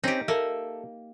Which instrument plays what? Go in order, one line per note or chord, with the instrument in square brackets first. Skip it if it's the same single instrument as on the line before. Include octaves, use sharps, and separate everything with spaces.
[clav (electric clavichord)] C4 C#4 [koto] D#4 G4
[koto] A#3 [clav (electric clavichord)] A4 E5